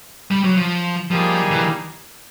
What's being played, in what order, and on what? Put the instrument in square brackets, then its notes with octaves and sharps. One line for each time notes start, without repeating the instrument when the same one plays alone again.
[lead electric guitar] G3
F#3
F3
[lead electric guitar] F3 [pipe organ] G3 A#3 D#4 G#4
[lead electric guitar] E3